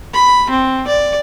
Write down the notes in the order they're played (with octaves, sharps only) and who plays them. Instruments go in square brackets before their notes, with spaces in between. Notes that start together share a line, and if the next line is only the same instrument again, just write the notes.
[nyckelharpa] B5
C4
D5